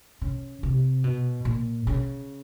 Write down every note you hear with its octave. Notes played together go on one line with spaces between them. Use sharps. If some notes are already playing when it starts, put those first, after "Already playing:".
C#3
C3
B2
A#2
C#3